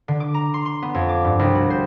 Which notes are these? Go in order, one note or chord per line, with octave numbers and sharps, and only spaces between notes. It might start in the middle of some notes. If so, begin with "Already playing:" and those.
D3
D6
A#5
C6
C6
B3
F2
D6
G2
C2
F#4
C5